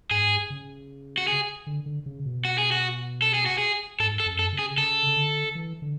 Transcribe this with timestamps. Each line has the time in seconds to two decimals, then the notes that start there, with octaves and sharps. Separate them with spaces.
0.11 G#2 G#4
0.50 C#3
1.18 F#4
1.28 G#4
1.67 D3
1.86 D3
2.06 C#3
2.26 B2
2.45 F#4
2.58 G#4
2.72 F#4
3.22 A4
3.34 G#4
3.46 F#4
3.58 G#4
4.00 G#2 A4
4.20 A4
4.26 F#2
4.39 A4
4.52 C#3
4.59 G#4
4.77 C#3 A4
5.07 C#3
5.17 D3
5.55 E3
5.82 D3